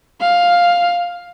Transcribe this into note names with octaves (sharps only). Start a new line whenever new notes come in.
F5